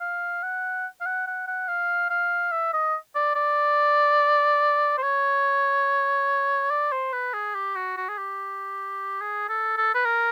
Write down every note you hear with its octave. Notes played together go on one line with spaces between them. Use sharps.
F5
F#5
F5
F#5
F#5
F#5
F5
F5
E5
D#5
D5
D5
C5
C#5
D5
C5
B4
G#4
G4
F#4
F#4
G#4
G4
G#4
A4
A4
B4
A#4